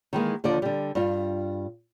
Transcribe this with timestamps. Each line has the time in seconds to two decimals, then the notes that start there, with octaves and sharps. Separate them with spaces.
0.13 D#3 E3 G#3 A#3
0.44 D#2 D3 F3 D5
0.62 D3 G3
0.95 G2 F4